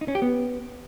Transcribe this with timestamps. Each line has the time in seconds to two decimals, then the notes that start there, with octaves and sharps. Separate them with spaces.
0.01 D#4
0.08 C#4
0.15 G4
0.22 B3